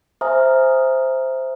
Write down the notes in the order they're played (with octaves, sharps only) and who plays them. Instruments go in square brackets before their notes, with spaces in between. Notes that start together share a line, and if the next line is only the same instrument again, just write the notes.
[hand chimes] C5 E5 G#5 A#5 D#6 F6